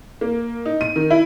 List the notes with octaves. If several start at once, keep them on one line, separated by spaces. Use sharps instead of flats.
A#3
D#4
D#7
D#3
E4